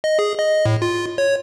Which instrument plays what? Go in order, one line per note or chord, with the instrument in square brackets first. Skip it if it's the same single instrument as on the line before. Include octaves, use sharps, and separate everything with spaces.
[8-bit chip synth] D#5
G#4
D#5
A2
F4
C#5